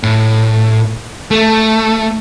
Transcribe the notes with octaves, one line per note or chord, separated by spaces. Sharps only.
A2
A3